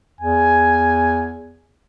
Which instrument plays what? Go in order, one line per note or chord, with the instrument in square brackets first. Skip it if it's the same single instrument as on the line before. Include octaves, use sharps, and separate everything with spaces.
[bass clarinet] E2 [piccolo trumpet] G#5